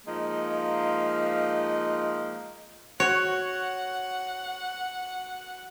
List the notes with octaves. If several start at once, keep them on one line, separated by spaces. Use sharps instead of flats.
F3 G#3 A#3 D#4
F#4 C#5 F#5